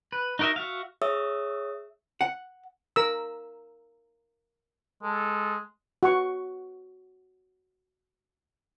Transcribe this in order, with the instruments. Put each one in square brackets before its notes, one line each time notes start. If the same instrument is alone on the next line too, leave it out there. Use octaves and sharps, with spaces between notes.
[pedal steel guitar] B4
D#4 F#4 A#4 D#5 E5
F#4 E5 F5
[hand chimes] G#4 C#5 E5 D#6 E6
[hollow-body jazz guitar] F#5
[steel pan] A#4 E6
[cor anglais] G#3 [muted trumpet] A4
[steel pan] F#4 F#5 C#6